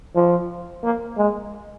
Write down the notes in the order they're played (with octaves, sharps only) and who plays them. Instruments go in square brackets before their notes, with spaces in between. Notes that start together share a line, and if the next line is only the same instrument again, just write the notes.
[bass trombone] F3
A#3
G#3